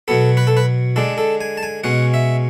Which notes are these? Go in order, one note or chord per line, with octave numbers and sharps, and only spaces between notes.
B2 F#3 B3 A4
B4
A4
B4
D3 G#3 D4 A4
A4
G#5
A5
G#5
B2 G#3 C#4 F#5
E5